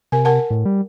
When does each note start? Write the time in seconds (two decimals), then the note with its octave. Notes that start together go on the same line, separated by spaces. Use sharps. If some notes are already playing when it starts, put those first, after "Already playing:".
0.12 C3 A#4 G#5
0.25 A#4 F#5 A5
0.50 A2
0.66 G3